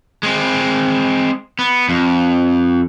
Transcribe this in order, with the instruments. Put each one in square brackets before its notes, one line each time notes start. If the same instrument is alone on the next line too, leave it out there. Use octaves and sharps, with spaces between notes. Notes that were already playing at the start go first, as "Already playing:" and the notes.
[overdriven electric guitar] G#3 C4
B3
F2